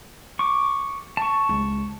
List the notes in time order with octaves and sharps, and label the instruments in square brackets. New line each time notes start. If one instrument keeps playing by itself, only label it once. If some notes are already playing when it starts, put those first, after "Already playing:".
[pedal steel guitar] C#6 D6
A5 C#6
[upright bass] C#2